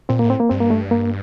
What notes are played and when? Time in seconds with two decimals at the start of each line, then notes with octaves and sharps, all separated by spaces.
0.09 A#2 C4
0.19 A2 A#3
0.30 C4
0.40 A#3
0.49 G2 C4
0.60 A#3
0.70 A3
0.91 A#3